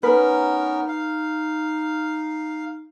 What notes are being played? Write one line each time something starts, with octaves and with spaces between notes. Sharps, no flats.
B3 C#4 D#4 A#4 B4
F5